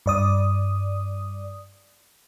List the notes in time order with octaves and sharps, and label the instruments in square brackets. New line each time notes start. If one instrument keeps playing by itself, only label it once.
[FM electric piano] G2 D5 D#6